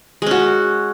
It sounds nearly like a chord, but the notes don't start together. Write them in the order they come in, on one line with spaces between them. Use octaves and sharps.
G#3 C#4 F#4